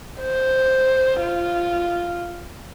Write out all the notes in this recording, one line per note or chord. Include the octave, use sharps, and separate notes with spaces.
C5
F4